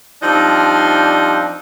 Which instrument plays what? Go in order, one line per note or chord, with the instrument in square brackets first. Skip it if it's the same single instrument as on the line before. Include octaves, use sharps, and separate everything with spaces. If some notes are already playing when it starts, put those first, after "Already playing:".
[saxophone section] F3 G3 C4 D4 D#4